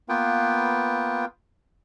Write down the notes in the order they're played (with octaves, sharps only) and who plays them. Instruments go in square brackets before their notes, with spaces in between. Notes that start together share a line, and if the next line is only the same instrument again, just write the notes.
[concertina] A#3 B3 F4 B4 G5